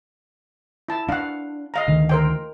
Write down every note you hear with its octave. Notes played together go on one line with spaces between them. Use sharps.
E4 A5
D4 F5 F#5
D#5 F5 A#5
D2 D#3
A#4 C5 G5